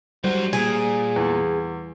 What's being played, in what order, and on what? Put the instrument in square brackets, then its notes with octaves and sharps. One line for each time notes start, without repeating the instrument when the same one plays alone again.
[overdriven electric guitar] G#2 F#3 [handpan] G3 [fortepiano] C5
[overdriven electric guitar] A#2 [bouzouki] G#4
[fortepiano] E2